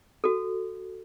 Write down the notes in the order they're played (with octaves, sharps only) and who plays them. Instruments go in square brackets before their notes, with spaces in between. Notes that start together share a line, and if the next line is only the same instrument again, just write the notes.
[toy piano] F#4 A4